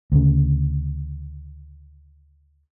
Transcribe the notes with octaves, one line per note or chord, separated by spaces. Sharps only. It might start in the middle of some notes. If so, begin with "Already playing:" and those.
D2 C#3